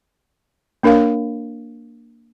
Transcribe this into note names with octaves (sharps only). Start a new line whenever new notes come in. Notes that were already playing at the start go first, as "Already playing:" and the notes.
A#3 D4 A#4 C#5 F5